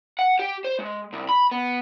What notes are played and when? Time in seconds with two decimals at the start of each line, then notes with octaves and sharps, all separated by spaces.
0.19 F#5
0.39 G4
0.64 C5
0.79 G#3
1.13 C2
1.29 B5
1.51 B3